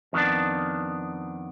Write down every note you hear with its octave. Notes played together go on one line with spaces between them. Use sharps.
F2 D#3 G#3 B3 D4